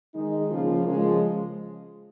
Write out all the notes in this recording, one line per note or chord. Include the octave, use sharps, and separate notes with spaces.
D#3 G#3 D#4
C#3 F3 A#3 F4
C#3 F3 G#3